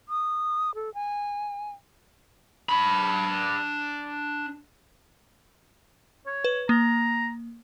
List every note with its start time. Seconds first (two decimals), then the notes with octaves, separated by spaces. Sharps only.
0.09 D#6
0.75 A4
0.94 G#5
2.69 D4 B5
6.26 C#5
6.44 B4
6.69 A#3 A#5